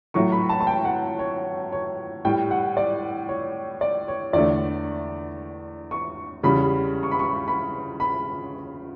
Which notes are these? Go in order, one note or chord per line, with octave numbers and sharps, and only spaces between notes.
A2 F#3 A3 C#6
B5
A5
A5
G5
F#5
C#5
C#5
A2 G3 G5
F#5
D5
C#5
D5
C#5
E2 D3 A3 D5
C#6
E2 C#3 G3 B5
C#6
B5
C#6
B5
B5